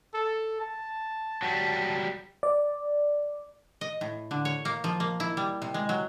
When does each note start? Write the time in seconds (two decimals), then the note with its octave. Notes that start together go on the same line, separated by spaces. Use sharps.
0.14 A4
0.60 A5
1.42 F#3 G3
2.43 D5
3.81 D#5
4.01 A2
4.31 D3
4.45 C#5
4.65 A#3
4.84 F3
5.00 A#3
5.20 E4
5.37 G3
5.62 C3
5.74 G#3
5.89 F#3